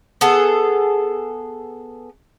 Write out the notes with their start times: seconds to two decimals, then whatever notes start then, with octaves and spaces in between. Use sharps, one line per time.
0.21 B3 G#4 A4